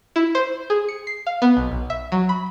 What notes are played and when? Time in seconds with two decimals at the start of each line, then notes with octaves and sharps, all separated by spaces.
0.16 E4
0.35 C5
0.70 G#4
0.89 C#7
1.07 C7
1.27 F5
1.42 B3
1.57 B1
1.72 B1
1.90 E5
2.12 F#3
2.29 B5